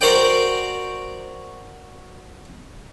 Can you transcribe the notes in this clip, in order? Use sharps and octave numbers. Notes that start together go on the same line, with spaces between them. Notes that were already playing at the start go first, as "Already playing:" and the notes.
F#4 A#4 C5 D5 G5